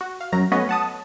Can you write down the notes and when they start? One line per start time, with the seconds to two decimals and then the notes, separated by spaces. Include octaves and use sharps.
0.01 F#4
0.21 F5
0.32 F#2 F#3 A#5
0.52 A3 B3 C#4 B4 C#5 D#5
0.69 F#5 A5 D#6